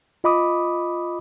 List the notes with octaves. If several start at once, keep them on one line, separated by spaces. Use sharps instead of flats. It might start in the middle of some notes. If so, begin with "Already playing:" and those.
F4 D#5 B5 D6 D#6